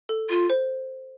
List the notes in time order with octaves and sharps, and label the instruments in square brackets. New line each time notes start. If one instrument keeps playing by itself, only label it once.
[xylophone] A4
[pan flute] F4
[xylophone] C5